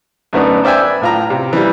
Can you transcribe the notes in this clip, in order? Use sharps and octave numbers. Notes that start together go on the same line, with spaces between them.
F#2 D3 A3 B3 D4 D#4
C5 D5 E5 G5 G#5
B4
A2 F4 A#5
C3
E3 G3